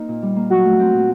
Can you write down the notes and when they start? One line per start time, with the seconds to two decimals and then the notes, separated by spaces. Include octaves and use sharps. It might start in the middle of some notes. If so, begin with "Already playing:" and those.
Already playing: A#3 C4 D#4
0.08 A#2
0.22 G3
0.36 A#3
0.50 F#3 F#4
0.65 A3
0.79 C4
0.94 A#2